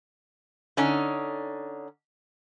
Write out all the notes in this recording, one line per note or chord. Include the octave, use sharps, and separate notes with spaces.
D3 C#4 D#4